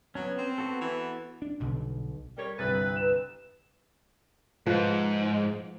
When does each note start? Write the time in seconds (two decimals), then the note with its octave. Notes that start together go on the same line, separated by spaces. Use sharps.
0.15 F#3 B3 C#4
0.38 C4
0.58 B3 F#4 A4
0.81 E3
1.42 D4
1.60 B1 G2 B2 D3
2.38 G3 A#4 C#5
2.59 G1 C2 B4 A6
2.96 B4 E7
4.66 G#2 F3 B4